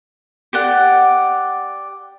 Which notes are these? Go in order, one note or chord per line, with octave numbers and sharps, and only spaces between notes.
G4 D5 F#5